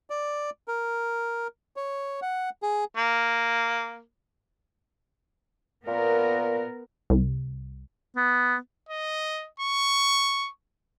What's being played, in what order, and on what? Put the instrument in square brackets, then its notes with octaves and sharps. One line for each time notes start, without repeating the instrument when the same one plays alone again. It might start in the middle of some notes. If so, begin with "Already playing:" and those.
[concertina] D5
A#4
C#5
F#5
G#4
[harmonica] A#3
[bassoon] A#2 [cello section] B3 A#4
[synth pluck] C2
[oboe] B3
[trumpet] D#5
C#6